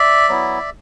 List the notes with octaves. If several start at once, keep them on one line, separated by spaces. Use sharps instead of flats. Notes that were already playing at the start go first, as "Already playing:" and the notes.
Already playing: D5 E5
F#3 B3 E4